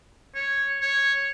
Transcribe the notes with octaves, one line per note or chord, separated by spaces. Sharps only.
C#5
C#5